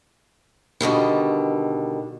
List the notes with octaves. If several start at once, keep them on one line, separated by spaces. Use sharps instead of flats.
B2 D3 D#3 G3